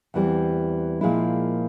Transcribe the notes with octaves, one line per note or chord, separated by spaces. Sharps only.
E2 E3 G3 C4
A#2 F3 G#3 E4